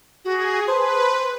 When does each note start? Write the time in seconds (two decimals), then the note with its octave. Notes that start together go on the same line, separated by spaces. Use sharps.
0.25 F#4 G#4
0.68 B4 C5 A5